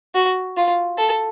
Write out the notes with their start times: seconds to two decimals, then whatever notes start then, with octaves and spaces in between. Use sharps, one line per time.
0.15 F#4
0.57 F4
0.98 A4